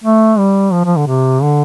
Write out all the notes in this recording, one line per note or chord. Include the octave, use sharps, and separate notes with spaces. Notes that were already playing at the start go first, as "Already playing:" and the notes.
A3
G3
F3
F3
D3
C3
D3